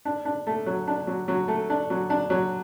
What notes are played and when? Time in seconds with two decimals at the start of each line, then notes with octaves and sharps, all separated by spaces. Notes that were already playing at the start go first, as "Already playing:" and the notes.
0.05 D4
0.25 D4
0.47 A3
0.66 F#3
0.87 D4
1.07 F#3
1.28 F#3
1.48 A3
1.70 D4
1.90 F#3
2.10 D4
2.30 F#3